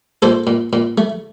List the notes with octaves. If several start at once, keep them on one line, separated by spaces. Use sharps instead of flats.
A#2 A4 C5
A#2
A#2
A3